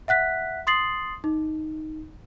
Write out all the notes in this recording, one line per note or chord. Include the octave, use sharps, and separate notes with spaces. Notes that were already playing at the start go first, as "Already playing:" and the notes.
E5 F#5 F#6 B6
C6 D#6 A6 C7 F#7
D#4